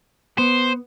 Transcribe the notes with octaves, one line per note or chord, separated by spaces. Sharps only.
B3 C5